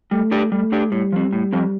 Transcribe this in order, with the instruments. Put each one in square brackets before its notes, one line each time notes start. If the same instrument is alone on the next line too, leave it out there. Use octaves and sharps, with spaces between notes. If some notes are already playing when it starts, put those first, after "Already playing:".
[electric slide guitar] G3 [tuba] A3
[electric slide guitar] D4 G4 D5
[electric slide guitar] G3 [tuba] A3
[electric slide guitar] D4 G4 D5
[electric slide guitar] A2 [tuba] G3
[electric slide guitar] F3 C4
A2
F3 C4